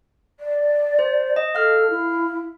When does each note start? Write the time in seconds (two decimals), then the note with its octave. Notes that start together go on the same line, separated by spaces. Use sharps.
0.40 D5
0.99 C5
1.36 D#5
1.55 A4 F5 F6
1.90 E4